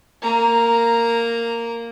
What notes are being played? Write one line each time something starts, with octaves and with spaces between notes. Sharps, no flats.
A#3 A#5